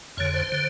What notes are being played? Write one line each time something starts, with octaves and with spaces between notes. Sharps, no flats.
F2 D3 C#5
C5
D3